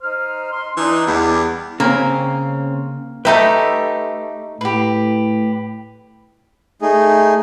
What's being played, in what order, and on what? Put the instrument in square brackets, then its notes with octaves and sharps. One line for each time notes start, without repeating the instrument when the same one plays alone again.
[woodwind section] D#4 C5 F6
C6
[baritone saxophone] E3 [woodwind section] D4 D#4
[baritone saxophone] E2 [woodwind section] G3
[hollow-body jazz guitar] C#3 C4 C#4 [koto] A#3
[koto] A3 D#4 G4 [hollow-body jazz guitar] B4 E5
[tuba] A2 [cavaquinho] G4 B4
[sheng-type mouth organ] A3 D#4 G#4